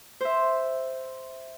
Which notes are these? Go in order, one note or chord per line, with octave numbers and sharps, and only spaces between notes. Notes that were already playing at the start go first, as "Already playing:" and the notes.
C5 E5